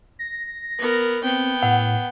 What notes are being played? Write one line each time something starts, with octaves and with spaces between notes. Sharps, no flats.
A#6
B3 A#4
B3 C4 G5
A2 F#5